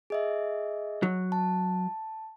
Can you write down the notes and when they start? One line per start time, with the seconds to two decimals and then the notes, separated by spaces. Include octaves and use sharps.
0.10 G#4 D#5 E5
1.03 F#3
1.32 A5